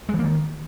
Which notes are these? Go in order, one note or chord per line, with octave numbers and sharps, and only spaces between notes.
G#3
E3
A#3
D#3